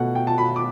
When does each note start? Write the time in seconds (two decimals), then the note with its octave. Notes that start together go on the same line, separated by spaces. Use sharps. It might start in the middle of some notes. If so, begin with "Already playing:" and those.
Already playing: B2 A3 F#5
0.15 G5
0.27 A5
0.38 B5
0.56 D6